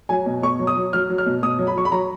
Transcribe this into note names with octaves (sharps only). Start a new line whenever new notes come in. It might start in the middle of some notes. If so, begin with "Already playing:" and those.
F#3 G#5
B2
B2 C#6
F#3
D#6
F#3
F#3 F6
F#3
F6
B2
B2 D#6
F#3
B5
F#3 C#6
B5
F#3 A#5